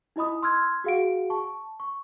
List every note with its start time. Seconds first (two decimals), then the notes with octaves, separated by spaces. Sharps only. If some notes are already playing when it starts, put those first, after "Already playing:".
0.16 D#4 E4 D#5 B5 D#6
0.42 C6 E6 F6 G#6
0.84 F#4 G#4 F5 F#5 D7
1.30 A5 C#6
1.80 C#6